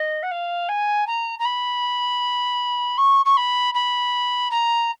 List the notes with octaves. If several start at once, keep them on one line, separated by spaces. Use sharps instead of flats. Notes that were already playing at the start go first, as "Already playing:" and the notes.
Already playing: D#5
F#5
F5
G#5
A#5
A#5
B5
C#6
C#6
B5
B5
A#5